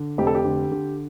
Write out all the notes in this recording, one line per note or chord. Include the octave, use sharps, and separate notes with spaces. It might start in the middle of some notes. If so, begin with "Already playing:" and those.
Already playing: D3
F1 G4
A4
G4
D3
D3